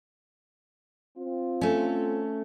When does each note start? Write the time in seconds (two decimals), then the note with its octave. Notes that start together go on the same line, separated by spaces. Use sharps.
1.17 C4 F4
1.61 A3 C#4